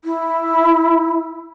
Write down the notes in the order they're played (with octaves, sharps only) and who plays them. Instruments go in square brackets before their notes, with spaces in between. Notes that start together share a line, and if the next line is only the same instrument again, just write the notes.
[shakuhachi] E4